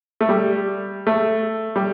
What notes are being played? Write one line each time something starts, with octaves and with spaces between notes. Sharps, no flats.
A3
G3
A3
G3